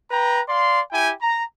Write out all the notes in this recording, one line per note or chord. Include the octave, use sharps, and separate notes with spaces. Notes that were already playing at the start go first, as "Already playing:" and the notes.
B4 G5 A#5
D5 F5 C6
E4 G4 G5 G#5
A#5